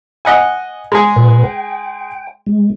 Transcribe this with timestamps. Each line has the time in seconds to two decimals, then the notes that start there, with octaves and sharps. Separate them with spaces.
0.25 D#5 F#5 G#5
0.92 G#3 G#4
1.16 A#2 B4
1.44 G5
2.47 G#3